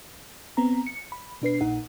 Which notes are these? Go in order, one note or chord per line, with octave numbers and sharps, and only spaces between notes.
B3 C4 A#5
C#7
B5
B2 D4 B4 C7
A#1 A#2 D#4 F#5